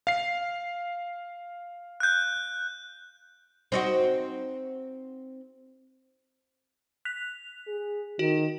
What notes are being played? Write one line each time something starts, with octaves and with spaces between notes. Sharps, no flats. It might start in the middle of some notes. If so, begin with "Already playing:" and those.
F5 C7
F#6 G6
C4 D#4 F#4
F#6 B6 F7
G#4
D#3 F#4